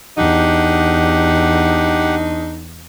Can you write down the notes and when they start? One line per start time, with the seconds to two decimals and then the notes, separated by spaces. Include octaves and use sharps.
0.18 E2 D4 D#4 G4 F#5